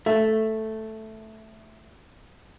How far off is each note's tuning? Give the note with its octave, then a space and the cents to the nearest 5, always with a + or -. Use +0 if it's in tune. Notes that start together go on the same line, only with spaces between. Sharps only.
A3 +0 E5 +5